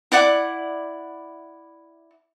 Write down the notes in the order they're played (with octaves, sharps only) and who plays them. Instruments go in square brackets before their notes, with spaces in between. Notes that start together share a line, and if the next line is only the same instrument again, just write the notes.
[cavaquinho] E4 D5 F#5 D6